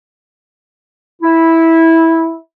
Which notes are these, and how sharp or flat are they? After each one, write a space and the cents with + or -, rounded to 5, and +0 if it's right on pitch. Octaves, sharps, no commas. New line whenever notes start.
E4 -10